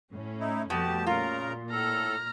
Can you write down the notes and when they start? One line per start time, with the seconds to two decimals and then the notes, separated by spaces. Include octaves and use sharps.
0.11 A2 C#4
0.40 D#4 E4
0.70 F2 B2 G3 A3 G4 A5
1.07 A#2 C#3 F4 A#4 A#5
1.71 A2 A4 A#5 F6